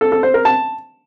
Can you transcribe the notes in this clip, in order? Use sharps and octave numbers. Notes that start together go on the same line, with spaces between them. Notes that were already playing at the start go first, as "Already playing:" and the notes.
A4
A4
C5
A#4
A5